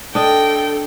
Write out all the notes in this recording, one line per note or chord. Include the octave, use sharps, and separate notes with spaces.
D4 A4 D#5 G5